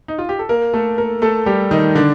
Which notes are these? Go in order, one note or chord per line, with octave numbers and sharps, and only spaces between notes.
D#4
F4
G4
A4
A#3 A#4
A3 A4
A#3 A#4
A3 A4
G3 G4
D#3 D#4
D3 D4